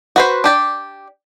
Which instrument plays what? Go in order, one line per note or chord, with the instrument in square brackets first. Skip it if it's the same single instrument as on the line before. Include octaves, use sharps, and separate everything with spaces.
[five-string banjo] F#4 B4 C5
D4 G4 D5